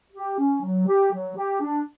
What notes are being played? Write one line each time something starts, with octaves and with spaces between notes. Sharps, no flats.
G4
C#4
F#3
G4
F#3
G4
D4